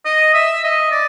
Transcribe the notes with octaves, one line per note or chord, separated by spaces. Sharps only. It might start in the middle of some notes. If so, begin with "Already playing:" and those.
D#5
E5
D#5
D5